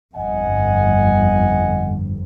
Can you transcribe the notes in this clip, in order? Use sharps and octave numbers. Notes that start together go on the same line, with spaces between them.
G1 F2 D#5 F#5 G#5